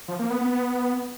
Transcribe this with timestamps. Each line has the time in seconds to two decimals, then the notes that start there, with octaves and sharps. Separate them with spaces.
0.08 F3
0.19 A#3
0.30 B3
0.41 B3